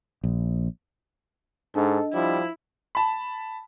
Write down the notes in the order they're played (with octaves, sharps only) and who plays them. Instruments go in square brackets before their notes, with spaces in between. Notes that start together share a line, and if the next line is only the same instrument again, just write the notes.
[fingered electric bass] A#1
[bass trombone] G#2 [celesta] D4 D#5 [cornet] A4
[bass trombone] F3 [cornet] G3 [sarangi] E4
[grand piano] A5 B5